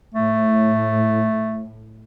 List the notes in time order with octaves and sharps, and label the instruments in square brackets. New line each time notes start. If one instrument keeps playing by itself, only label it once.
[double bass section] A2 [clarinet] A3